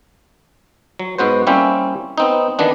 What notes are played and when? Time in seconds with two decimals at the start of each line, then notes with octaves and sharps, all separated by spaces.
0.99 F#3
1.18 G#2 B3 F#4 C5
1.47 G3 A#3 C4 C#4 E4 G4
2.18 B3 C4 D#4
2.59 D#3 E3 B3 D4